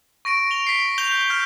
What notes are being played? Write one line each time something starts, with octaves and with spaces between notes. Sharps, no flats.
C#6 A#6 D7 D#7
F7 G7
B6 C7
G6 F7 G7
F6 G6